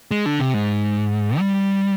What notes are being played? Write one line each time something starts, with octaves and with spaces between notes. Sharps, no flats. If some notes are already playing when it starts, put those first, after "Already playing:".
G#3
D3
C3
G#2
G3